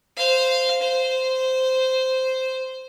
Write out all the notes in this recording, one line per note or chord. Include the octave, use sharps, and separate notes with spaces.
C5 F5
C5